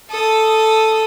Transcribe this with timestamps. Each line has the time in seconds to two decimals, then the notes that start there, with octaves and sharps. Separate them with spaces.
0.10 A4 D#6